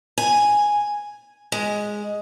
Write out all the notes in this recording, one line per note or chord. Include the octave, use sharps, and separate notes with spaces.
G#5
G#3